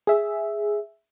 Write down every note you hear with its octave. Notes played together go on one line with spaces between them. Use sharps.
G#4 E5